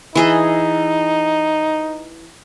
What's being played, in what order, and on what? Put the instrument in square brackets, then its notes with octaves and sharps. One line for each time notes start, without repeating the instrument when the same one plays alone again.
[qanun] E3 G#4 D#5 [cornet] D#4